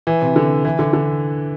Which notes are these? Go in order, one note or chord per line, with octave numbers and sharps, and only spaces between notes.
E3
C3
D3
E3
D3
D3